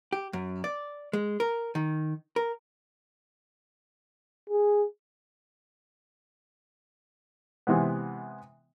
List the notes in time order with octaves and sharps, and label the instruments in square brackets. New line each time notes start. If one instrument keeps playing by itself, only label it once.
[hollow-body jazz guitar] G4
F#2
D5
G#3
A#4
D#3
A#4
[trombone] G#4
[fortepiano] C3 E3 G#3 B3